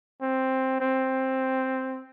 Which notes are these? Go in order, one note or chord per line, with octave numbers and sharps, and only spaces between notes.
C4
C4